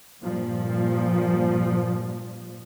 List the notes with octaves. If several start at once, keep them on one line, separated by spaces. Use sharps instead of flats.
G2 A#2 F3